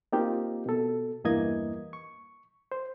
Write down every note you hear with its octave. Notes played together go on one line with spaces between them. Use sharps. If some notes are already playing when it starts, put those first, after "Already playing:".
A#3 C4 D#4 F4 G4
B2 A4
E2 G2 E3 A#3 D#5 G#6
C#6
C5